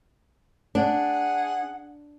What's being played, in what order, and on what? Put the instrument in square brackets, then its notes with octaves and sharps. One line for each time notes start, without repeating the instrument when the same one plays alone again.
[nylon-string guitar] D4 [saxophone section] G#4 F#5